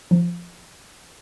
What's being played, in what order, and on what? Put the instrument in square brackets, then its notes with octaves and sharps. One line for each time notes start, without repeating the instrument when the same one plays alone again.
[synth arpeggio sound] F3